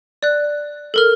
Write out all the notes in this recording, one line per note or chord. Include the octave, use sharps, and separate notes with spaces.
D5 F#6
A4 A#4 F6